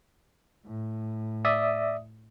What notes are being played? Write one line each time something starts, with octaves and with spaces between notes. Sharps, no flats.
A2
D5 E5 D#6